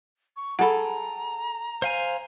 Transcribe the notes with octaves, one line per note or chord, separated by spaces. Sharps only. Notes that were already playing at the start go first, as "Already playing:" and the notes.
C#6
G#4 A4 F#5 A#5 B5
C5 F5 G#5